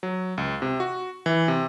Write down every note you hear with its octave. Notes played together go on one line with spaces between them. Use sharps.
F#3
C#2
C3
F#4
E3
C3